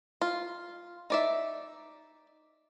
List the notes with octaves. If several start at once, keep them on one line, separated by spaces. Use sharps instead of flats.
F4
D#4 D5 E5